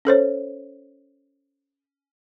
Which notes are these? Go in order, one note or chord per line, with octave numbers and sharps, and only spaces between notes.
C#4 A4 C5 C#5